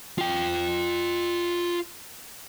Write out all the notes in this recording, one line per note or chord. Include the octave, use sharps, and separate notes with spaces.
F4 G5